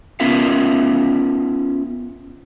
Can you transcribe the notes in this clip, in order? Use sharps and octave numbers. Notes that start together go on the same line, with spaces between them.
B3 C#4 F4 A#4 E5 F5